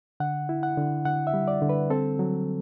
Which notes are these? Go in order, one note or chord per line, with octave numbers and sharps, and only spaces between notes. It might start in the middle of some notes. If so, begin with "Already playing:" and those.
D3 F#5
E4
F#5
D3
D3 F#5
E5
G3
D5
D3
B4
C4 A4
F#3